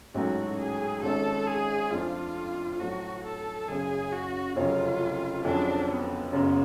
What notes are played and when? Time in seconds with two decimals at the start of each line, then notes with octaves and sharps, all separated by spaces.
0.14 A1 G#2 F#3 A3 C#4 F#4
0.59 G#4
1.02 G#1 G#2 G#3 C#4 A4
1.47 G#4
1.91 F2 F3 A3 D4 F4
2.79 A2 F#3 A3 F#4
3.24 A4
3.68 F#1 F#2 C#3 G#4
4.12 F#4
4.56 F1 F2 C#3 F#3 C#4 F4
5.45 F2 D3 F#3 C#4 D4 G#4
5.89 B3
6.33 F#1 F#2 C#3 B3